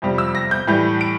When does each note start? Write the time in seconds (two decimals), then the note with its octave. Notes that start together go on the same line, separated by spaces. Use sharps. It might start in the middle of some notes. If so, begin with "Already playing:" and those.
0.02 F2 C3 G3
0.18 E6
0.35 A#6
0.51 G6
0.67 A2 E3 G3 G6
1.01 D7